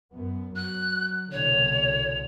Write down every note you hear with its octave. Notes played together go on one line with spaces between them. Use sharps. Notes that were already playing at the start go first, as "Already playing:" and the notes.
F#2 B3
F#3 F#6
C2 B2 D3 C#5